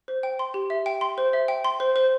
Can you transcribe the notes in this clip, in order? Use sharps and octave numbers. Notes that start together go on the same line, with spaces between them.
C5
G5
C6
G4
E5
G5
C6
C5
E5
G5
C6
C5
C5